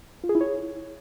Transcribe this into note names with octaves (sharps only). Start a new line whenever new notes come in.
F4
G#4
E4
C#5